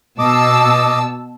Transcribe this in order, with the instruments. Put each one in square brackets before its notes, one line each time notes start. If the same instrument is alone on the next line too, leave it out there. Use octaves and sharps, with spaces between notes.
[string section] B2 A5 E6 [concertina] D#5 D6